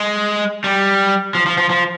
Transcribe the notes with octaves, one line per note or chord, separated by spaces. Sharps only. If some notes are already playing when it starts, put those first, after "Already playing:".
Already playing: G#3
G3
F3
F3
F3
F3